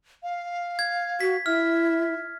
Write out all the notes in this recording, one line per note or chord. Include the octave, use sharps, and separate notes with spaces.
F5
G#6
F#4 B6
E4 E5 F6